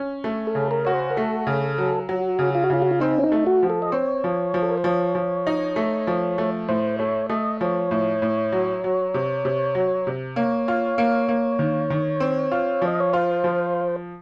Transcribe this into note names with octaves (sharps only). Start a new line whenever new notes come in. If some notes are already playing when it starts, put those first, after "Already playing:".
Already playing: C#4
A3
A4
C#3
A#4
F#4 C#5
C5
A#4
A3 A4
C#3
F#3
F#3 F#4
C#3
F4
F#4
C#3 F4
F#4
F4
C4 D#4
C#4
D#4
A3
F#4
F3
A4
D#5
C4 C#5
F3
F3
A4
A#4
C5
F3 C#5
F3
D#4
A3
F3
A3
A2 C5
A3 C#5
A3 D#5
F3 C#5
A2
A2
F#3
F#3
C3
C3
F#3
C3
A#3 C#5
F4
A#3
A#3
D#3
D#3
C4
F4
F3
D#5
C#5
F4 C5
F3